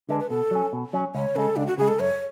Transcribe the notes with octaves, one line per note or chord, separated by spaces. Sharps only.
D3 G#3 D4 B4
B4
B2 A4
F#3 C#4
B2
F#3 C#4
C#2 C#5
C#3 G#3 A4
C#2 D4
F#4
C#3 G#3 G#4
A4
F#2 C#5